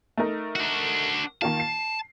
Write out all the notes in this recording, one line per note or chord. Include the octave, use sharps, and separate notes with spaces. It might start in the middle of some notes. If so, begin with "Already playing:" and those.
A3 D#4 A#4
D4 F#4
D#3 A#3 F4 A5
C7